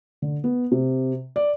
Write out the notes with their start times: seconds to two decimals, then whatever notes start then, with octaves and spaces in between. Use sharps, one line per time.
0.22 D3
0.44 B3
0.72 C3
1.36 D5